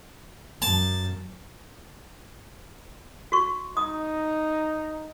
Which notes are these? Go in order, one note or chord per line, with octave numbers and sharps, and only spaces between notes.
F#2 A5
F#4 C#6
D#4 D#6